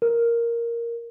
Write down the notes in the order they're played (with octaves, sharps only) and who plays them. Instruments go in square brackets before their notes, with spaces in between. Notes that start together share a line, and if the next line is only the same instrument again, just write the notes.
[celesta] A#4